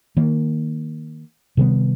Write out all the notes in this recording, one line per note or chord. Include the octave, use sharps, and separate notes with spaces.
D#3 A#3
C3 D#3 G3 B3